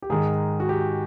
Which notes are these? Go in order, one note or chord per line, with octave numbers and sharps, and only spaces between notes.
G4
G#2 D#3 G#3 G#4
F#4
G4